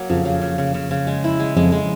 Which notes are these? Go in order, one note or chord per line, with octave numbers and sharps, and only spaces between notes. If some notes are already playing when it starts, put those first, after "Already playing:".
Already playing: F#3 A#3
F2 C#3 F3
C#3
C#3
C#3
C#3
C#3
G#3
E4
G#3
F2 F3 G#3
G#3